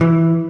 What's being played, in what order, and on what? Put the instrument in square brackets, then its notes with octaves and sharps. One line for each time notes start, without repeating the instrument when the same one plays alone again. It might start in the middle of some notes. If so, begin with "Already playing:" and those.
[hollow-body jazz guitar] E3